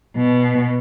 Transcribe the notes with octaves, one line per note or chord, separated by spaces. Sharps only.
B2